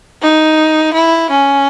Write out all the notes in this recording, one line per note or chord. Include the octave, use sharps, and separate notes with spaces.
D#4
E4
C#4